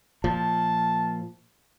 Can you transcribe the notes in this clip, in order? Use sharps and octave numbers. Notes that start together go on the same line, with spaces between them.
A#2 F3 A5